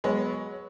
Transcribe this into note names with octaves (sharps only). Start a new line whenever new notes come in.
F#3 G#3 B3